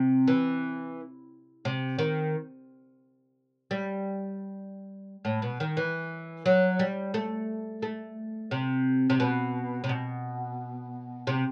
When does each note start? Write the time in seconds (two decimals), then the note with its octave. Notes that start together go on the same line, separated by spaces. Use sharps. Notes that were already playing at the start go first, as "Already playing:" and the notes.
Already playing: C3
0.28 E3
1.65 C3
1.99 D#3
3.71 G3
5.25 A2
5.42 B2
5.60 D#3
5.77 E3
6.46 F#3
6.79 G3
7.14 A3
7.82 A3
8.51 C3
9.10 C3
9.20 B2
9.84 C3
9.89 B2
11.27 C3